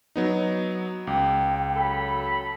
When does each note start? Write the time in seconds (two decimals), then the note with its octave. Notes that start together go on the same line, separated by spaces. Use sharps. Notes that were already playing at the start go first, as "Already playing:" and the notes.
0.16 F#3 B3 D#4
1.07 C#2 G5
1.76 F#3 A4 B5